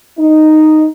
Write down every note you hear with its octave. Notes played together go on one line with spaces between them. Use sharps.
D#4